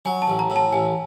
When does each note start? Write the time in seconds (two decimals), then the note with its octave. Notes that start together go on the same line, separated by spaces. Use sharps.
0.05 F#3 G#5
0.22 A5
0.28 A1
0.39 A#5
0.50 A2
0.56 A5
0.72 A1 G#5